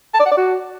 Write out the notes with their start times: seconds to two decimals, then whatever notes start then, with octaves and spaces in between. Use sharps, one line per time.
0.14 A5
0.20 D5
0.26 F#5
0.31 D5
0.37 F#4